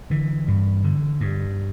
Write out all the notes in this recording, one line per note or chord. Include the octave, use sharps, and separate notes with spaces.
D3 E3
G2
D3
G2